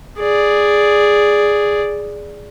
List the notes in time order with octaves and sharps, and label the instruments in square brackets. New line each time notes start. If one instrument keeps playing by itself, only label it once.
[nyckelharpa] G#4 D5